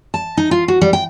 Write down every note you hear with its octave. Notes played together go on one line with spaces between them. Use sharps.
A5
D#4
F4
F#4
G3
G5